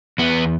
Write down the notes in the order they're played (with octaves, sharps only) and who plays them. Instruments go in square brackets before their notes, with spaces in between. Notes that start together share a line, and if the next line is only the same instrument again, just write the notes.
[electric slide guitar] E2 B3